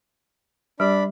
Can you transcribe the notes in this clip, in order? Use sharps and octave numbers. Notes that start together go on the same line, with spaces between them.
G3 D4 G4 B5